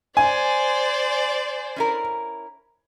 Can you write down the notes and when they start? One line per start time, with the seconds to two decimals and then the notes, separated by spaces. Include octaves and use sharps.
0.17 C5 D5 G#5
1.76 C#4 E4 A#4